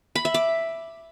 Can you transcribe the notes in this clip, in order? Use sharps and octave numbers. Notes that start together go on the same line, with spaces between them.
B5
E5
D6